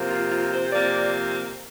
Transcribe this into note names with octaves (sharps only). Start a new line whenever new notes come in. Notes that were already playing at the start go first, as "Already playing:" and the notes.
Already playing: C3 F3 A#3
F4
F4
C5
C3 F3 A#3 D5